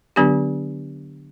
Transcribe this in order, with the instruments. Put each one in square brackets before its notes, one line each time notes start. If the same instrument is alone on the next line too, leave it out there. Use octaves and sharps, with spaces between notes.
[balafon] D3 F#3 B3 D4 G4